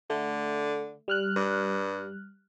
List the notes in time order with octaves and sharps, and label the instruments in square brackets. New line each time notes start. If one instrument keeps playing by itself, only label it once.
[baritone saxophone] D3 [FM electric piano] A3
[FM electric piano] G3 F6 F#6
[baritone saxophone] G2